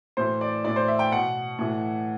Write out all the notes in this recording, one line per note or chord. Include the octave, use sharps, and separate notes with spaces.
A2 E3 C5
D5
A2 E3 D5
C5
E5
G5
B2 F#5
A2 E3